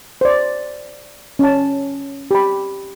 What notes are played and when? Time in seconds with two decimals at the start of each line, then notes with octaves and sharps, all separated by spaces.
0.21 C5 D5
1.39 C#4 A5
2.31 G4 B5